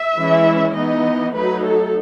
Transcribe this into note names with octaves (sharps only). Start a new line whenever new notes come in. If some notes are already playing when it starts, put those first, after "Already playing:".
Already playing: E5
E3 G#3 C#4 E4
E3 B3 D#4 D#5
F#3 A3 D#4 B4
A4